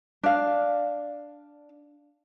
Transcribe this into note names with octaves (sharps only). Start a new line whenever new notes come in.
D4 F5